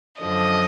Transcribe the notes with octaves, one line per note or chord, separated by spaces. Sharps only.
F#2 D3 F3 D#5